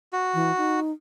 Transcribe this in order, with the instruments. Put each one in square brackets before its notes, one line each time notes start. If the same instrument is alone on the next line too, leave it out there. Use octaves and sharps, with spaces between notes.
[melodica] F#4
[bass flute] E3
D#4